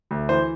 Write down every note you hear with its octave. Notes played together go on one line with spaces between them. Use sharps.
D2
E3 C5